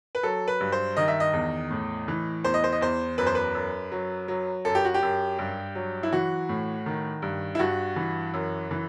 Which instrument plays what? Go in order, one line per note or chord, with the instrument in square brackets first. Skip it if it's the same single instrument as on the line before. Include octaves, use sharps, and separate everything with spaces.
[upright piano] B4
F#3 A4
B4
G2
C5
D#3 D#5
E5
D#5
E2
A2
E3
E2 C5
D#5
C5
D#5
E2 C5
F#2 B4
C5
B4
F#2
F#3
F#3
F#2 A4
G4
F#4
G4
F#2
G2
F#3
E4
E3 F#4
A2
D#3
G2
E4
G2 F#4
E3
F#2
E3